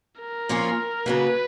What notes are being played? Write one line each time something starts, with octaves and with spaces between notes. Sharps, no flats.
A#4
A#2 F3 A#3 C#4 F4
C#3 F#3 A#3 B4